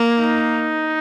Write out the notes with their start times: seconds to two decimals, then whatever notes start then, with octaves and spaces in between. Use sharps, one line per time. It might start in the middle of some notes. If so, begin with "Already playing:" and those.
Already playing: A#3
0.19 D#4